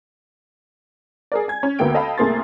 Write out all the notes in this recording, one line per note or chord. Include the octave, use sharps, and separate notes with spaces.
G#4 A#4 D5
G#5 G#6
C#4
D2 D3 A#3 B3 G5 D7
A4 D#5 F5 G5 A5 B5
C2 A3 A#3 G#4 C6 A6